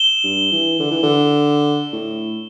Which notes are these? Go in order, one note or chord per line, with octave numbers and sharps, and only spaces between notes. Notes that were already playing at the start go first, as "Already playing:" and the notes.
Already playing: E7 G7
G2
E3
D3
E3
D3
A2